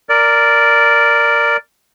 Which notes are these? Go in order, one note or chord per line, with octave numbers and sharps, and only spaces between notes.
A#4 D5